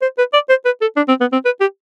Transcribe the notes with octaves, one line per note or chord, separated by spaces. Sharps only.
C5
B4
D5
C5
B4
A4
D4
C4
B3
C4
B4
G4